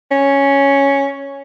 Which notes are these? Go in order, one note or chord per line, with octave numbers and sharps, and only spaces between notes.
C#4